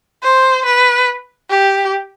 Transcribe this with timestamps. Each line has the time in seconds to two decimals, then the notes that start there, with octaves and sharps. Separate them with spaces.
0.23 C5
0.65 B4
1.50 G4